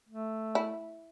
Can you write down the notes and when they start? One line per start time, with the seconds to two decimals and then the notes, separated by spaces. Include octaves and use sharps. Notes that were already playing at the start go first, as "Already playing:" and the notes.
0.09 A3
0.55 E4